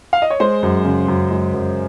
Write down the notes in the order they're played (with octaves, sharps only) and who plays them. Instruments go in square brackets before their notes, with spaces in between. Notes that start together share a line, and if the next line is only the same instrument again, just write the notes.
[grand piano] F5
D#5
C#5
G#3 G#4 C5
F#2
C#3
F#2
G#3
F#2